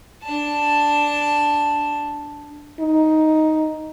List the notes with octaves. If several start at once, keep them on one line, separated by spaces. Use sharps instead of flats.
D4 A5
D#4